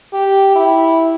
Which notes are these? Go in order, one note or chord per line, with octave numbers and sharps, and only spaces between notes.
G4
E4